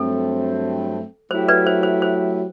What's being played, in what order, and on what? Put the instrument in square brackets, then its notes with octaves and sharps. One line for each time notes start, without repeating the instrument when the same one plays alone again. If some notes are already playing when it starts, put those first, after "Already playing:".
Already playing: [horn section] G2 F#3 A3 C4 [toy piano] A4
[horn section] F#3 A3 E4 G4 [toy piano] C5
[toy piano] B4 D5
C5
C5
C5